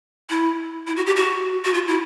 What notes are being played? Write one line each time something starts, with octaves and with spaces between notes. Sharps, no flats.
E4
E4
F#4
G4
F#4
F#4
F4
E4